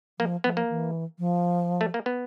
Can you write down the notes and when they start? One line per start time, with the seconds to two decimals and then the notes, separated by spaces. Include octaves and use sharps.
0.19 F3 A#3
0.44 F3 B3
0.57 A#3
0.70 E3
1.19 F3
1.81 A3
1.94 A#3
2.06 B3